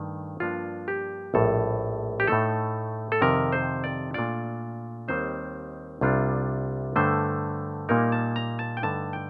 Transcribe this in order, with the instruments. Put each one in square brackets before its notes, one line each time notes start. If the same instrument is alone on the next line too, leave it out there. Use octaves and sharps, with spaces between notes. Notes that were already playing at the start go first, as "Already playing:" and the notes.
Already playing: [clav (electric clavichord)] G2 D#3 A3
G2 F3 A#3 D4 F4
G4
A#1 A2 G3 A4
G4
A2 A3 D#4 A4
A4
F2 C3 D#3 A#4
C5
D5
A#2 A3 D4 F4 D5
D#2 D#3 G3 C4 D#4 C5
C2 C3 G3 D4 F4
G2 D3 A3 C5
A#2 G3 A#3 D#4 A#4
A5
A#5
A5
G5
G2 D3 A3 D#4 A5
G5